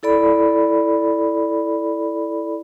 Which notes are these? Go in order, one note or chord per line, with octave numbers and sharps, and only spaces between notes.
E4 A4 D5 B5